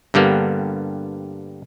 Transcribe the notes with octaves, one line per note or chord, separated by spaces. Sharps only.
G2 D3 G3 A#3 B3